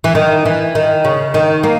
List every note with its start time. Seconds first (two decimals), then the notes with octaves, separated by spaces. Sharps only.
0.04 E3
0.15 D#3
0.45 E3
0.75 D#3
1.05 C#3
1.34 D#3
1.63 A#3